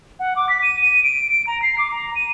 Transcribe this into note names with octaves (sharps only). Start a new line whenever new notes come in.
F#5
D6
B6
D#7
D#7
D7
D7
A#5
C7
D6
A#5
D#7